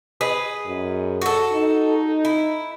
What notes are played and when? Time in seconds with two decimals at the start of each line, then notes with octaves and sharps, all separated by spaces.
0.21 G#4 B4 D#5
0.66 F#2
1.22 F#4 A4
1.53 D#4
2.25 E4